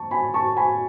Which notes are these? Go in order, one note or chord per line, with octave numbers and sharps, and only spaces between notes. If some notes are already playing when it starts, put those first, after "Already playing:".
Already playing: A5 C#6
G#5 B5
A5 C#6
G#5 B5